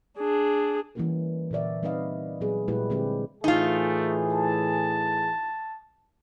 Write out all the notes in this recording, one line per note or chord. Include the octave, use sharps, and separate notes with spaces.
D4 G#4
E3 G3 A#3 C#4 G4 A#4
A#2 D3 A#4 D5 E5
G3 C4 D#4 B4 D#5 F5
A#2 F#3 B3 G#4 B4
A#2 G3 G#3 E4 G4 B4
D3 G#3 C4 G4 A4 B4
A2 E3 A3 D#4 F4 G#4
A5